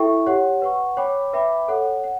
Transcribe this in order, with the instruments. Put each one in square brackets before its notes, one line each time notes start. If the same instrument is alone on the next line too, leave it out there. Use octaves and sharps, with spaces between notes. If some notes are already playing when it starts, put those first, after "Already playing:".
Already playing: [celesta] E4 A4 E5 G5 C#6
G4 C#5 F#5
B4 F#5 C#6
C#5 G5 B5 D6
B4 E5 G5 B5 D6
A4 C#5 F#5
F#5